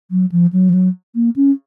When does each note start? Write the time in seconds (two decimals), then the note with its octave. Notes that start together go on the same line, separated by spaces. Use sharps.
0.11 F#3
0.32 F3
0.53 F#3
0.69 F3
0.74 F#3
1.15 A#3
1.36 C#4